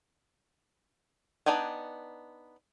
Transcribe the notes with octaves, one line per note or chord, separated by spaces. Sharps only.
B3 D4 D#4 G5 G#5